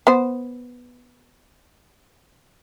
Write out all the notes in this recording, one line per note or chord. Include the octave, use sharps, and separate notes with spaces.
B3 C5